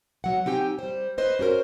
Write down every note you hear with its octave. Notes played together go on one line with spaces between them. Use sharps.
B2 F#3 F#5
C4 D#4 G4 G5 G#5
G3 C5
B4 C5 D#5
C#4 F#4 G4 A#4 C5